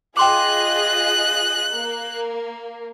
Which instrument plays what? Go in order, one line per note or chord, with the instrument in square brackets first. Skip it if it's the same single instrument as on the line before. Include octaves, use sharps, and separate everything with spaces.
[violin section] F4 G#4 D#5 [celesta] G5 C6 D6 [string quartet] F#6
[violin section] A#3